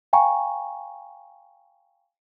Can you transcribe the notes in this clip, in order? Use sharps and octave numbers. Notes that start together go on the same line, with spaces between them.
F5 G5 G#5 A#5 C#6